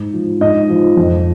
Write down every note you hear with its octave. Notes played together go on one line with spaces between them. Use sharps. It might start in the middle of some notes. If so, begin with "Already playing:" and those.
Already playing: G#2
F3
G#2 D#5
F3
F2